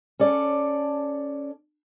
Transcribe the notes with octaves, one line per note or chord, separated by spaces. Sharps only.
C#4 A4 D5